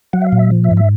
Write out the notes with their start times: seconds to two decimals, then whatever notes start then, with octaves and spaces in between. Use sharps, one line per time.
0.13 F#3 F#5
0.22 E5
0.27 F5
0.32 A#2
0.39 E5
0.51 F3
0.64 E5
0.71 G#2
0.77 E5